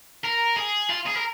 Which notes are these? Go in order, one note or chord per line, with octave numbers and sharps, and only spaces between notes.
A#4
G#4
F4
G#4
A#4